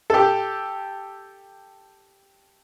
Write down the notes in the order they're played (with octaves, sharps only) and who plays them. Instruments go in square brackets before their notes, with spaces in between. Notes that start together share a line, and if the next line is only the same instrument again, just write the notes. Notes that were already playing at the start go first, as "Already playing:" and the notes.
[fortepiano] G4 A4